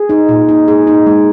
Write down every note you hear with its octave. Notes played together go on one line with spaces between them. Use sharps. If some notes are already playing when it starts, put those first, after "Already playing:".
Already playing: G#4
D#4
A#2
D#4
G#4
D#4
G#3